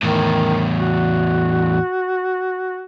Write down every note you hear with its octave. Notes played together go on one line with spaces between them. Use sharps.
E2 A2 D#3
F#4